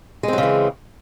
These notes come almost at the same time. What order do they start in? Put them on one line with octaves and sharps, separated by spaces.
G#3 C4 F#3 C#3 E3